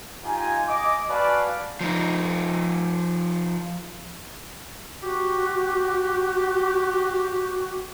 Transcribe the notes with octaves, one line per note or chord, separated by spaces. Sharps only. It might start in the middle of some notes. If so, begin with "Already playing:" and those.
D#4 F4 G4 G#5
D#5 D6
F#4 B4 D5 F5 G#5 A5
F3 D#4
F#4 G4